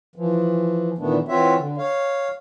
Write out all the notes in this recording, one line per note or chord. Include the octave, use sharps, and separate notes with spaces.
E3 F3
A#2 D#3 E3 A3 B3 D4
E3 C4 F4 F#4 C#5 E5
D3
C#5 F5